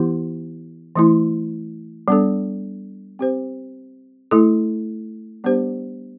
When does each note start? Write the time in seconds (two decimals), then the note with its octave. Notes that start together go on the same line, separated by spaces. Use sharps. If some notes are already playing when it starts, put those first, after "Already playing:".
Already playing: E3 B3 E4 G4
0.96 E3 A3 E4
2.08 G3 B3 D4 A4
3.19 C4 G4 C5
4.31 A3 E4 A4
5.44 G3 B3 D4 G4 C5